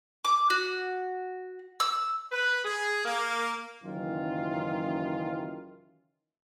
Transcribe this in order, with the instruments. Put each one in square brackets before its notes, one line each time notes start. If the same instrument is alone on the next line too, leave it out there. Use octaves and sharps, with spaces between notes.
[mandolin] D6
F#4
E6
[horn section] B4
G#4
A#3
[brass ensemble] F#1 F#2 D#3 E3 F4